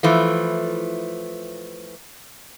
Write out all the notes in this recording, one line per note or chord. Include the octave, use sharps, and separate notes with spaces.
E3 F3 A3